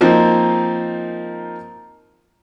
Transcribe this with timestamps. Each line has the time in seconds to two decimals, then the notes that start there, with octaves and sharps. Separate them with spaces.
0.01 F3 A#3 C4 D#4